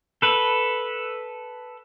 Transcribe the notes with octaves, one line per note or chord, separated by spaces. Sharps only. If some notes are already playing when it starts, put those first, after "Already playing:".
A4 B4